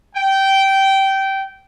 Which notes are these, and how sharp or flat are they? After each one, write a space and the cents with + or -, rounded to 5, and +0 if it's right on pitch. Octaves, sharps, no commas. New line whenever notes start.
G5 -15